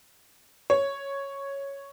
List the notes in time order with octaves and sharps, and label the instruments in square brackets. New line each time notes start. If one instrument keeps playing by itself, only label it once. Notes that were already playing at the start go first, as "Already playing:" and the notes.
[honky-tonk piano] C#5